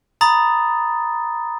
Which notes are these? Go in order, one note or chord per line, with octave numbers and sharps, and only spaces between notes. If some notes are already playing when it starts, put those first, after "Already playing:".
A#5 B5 D#6 A6